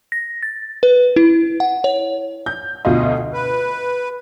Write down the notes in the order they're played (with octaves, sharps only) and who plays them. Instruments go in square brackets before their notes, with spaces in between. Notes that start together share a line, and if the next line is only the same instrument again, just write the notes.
[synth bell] A#6
A6
B4
E4
F#5
C#5
[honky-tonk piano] G6
D2 B2 F4 D#5
[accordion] B4